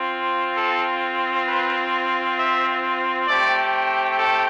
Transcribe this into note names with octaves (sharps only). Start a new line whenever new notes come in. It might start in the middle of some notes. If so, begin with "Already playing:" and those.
Already playing: C4 F4
A4
B4
E5
A3 C4 G4 D5
A4